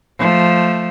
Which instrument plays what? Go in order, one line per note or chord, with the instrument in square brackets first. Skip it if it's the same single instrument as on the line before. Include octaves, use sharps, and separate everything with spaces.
[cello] F3 A3